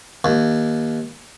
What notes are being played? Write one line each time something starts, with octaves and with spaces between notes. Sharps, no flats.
D#2